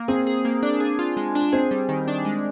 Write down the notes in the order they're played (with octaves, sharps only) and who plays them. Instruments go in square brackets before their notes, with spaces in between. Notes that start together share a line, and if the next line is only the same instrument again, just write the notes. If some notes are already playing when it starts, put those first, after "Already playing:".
Already playing: [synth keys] A#3
[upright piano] C4 C5 [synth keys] G#4
[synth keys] G#4
A#3
D4
G#4
F4
G#3
D4
[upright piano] C4 C5 [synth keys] G#4
[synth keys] G3
D#3
D4
G#3